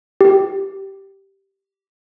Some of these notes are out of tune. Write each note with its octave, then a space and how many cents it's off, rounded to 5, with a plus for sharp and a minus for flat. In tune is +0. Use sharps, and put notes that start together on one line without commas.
G4 -10